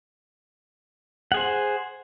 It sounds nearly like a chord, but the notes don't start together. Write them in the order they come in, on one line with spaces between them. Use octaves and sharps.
F#5 G#4 C5